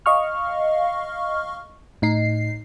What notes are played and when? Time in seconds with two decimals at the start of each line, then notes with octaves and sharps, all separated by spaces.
0.06 D#5 F5 C#6 F6
2.02 A2 D#4 C7